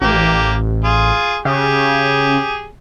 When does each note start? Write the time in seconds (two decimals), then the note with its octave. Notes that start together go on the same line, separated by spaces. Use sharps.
0.01 A1 A#3 G4
0.84 F4 G#4
1.45 C#3 G4 G#4